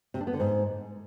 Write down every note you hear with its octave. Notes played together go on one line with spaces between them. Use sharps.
C3
D4
B3
D3
G#2